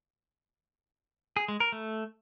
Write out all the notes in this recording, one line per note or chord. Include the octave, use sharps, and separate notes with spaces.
G#4
G#3
A#4
A3